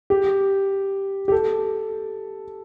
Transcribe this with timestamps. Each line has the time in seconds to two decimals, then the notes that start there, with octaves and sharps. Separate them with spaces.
0.10 G4
1.28 G4
1.32 A4